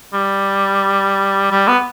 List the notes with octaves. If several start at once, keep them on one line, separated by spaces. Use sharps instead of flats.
G3
G3
B3